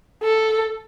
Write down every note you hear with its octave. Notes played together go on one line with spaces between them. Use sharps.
A4